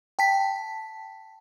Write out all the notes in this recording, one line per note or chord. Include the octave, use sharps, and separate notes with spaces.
G5 A5 B6